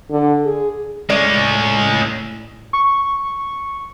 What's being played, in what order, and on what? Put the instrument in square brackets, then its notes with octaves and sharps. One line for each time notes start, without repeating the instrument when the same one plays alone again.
[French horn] D3
G#4
[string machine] A2 [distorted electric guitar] G#3 C#4 [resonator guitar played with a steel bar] D5
[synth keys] C#6